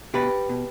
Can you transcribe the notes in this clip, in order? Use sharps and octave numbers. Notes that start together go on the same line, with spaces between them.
B2 G4 B4
B2